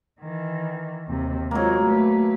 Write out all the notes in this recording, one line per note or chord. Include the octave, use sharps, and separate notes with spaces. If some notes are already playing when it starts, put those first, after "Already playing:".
D#3 E3
D#2 C3
F#3 G#3 A#3 C#5
A3 B4